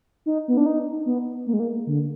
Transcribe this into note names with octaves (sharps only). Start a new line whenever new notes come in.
D#4
B3
D4
D#4
B3
A#3
G#3
A#3
D3